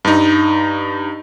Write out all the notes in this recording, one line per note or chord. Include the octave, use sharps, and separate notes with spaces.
G2 D#4